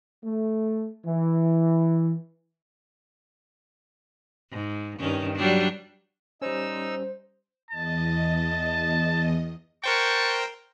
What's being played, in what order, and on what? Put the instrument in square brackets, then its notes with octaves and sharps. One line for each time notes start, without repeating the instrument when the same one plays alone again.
[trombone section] A3
E3
[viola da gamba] G#2
G2 D#3 C#4
F#3 G3 D4
[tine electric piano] G3 C#4 [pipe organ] D#4 E6 [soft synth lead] C5
[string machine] E2 D#5 [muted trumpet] A5
[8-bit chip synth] A#4 C5 G5 [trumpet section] F#5 A5 C#6